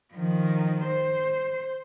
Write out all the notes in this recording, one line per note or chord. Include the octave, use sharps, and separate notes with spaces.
D#3 F3
C5